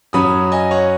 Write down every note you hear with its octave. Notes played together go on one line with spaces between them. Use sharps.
F#2 F#3 C#4 B5 D#6
D#5 G#5
C#5 F#5